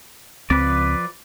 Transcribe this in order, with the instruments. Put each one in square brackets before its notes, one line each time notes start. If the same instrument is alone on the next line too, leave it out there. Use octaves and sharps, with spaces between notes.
[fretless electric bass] C#2 C4 [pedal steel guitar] F3 B4 D5